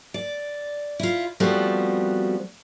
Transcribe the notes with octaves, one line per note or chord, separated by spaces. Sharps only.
D5
E4 F4
F3 G3 A3 B3 C4 F#4